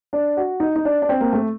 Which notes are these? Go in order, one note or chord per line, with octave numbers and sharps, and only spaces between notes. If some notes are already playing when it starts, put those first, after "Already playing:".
D4
F#4
D#4
D#4
D4
D4
C4
A#3
A3